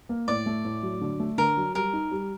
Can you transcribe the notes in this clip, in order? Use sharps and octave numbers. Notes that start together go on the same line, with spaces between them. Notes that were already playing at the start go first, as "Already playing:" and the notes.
A#3
A2 D5
A3
A2
F#3
D3
A3
D3 A#4
F#3
G3 A#4
D#4
G3